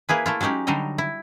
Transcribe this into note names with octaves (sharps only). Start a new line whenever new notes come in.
A#3 E4 G#4 B4
A3 E4 F4
F#3 G#3 C#4 D#4 G4
D3 F#3 G3 D#4 D#5
E4